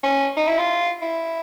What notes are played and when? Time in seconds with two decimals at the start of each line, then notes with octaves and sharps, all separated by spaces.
0.04 C#4
0.37 D#4
0.47 E4
0.58 F4
1.02 E4